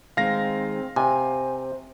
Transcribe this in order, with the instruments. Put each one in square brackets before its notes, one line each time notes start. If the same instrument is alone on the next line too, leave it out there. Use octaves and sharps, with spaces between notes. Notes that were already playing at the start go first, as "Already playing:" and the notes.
[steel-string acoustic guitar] D#3 G#3 [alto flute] C4 [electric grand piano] F5 A#6
[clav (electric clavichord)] C3 [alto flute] C5 [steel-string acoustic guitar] G#5